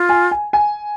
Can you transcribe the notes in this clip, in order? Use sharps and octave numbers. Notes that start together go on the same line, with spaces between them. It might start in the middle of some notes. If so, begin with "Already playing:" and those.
Already playing: F4
G#5
G#5
G#5